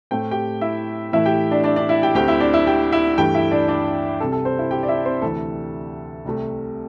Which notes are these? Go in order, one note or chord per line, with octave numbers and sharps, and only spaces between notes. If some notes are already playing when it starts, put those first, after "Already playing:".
A2 A3 C4 G5
G4 G5
E4 E5
A2 E3 A3 E4 E5
G4 G5
D4 D5
D4 D5
D4 D5
E4 E5
G4 G5
D2 D3 C4 G4 G5
E4 E5
D4 D5
E4 E5
G4 G5
E4 E5
G2 E3 A3 G4 G5
E4 E5
D4 D5
D4 D5
C2 C3 G3 A4
A4
C4 C5
E4 E5
G4 G5
D5
E4 E5
C4 C5
D2 C3 E3 A4
C2 C3 A3